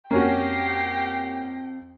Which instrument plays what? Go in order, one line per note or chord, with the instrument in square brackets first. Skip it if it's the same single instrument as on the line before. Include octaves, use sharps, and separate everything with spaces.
[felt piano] F2 [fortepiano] A#3 C#4 F#4 [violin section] G4 A#6 C7 [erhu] G5